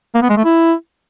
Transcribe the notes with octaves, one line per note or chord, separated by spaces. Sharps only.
A#3
B3
G#3
A3
E4